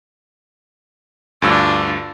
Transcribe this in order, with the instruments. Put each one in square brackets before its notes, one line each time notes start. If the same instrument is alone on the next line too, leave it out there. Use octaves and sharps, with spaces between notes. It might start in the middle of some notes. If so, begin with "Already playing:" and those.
[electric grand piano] D2 G2 E6 [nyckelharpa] D4 F4